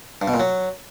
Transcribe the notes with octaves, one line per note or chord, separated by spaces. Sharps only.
G2
B2
A#2
F#3